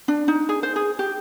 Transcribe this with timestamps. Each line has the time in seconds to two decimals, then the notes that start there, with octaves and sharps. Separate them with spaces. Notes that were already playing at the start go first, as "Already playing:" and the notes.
0.08 D4
0.28 D#4
0.49 G#4
0.63 C5
0.76 G#4
0.99 G4